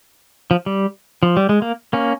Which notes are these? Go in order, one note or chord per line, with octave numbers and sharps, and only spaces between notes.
F3
G3
F3
G3
G#3
A#3
A#3 C#4